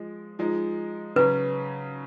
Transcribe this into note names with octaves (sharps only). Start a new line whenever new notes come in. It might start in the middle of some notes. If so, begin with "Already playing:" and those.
Already playing: F3 G#3
F3 G#3 D#4
C#3 F#3 C#4 B4